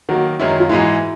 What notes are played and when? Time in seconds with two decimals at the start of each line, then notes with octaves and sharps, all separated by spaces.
0.09 D#3 F#3 A#3 F#4
0.40 F#2 D#3 G#3 C#4 E4
0.60 F4
0.69 G#2 E3 G#3 E4